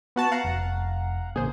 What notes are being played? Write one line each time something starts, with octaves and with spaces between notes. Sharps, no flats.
B3 F#4 A5
F5 F#5 A#5
F1
A1 C#3 A#3 G#4 C5